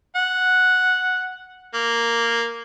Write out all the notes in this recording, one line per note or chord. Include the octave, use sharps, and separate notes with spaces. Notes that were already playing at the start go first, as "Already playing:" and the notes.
F#5
A#3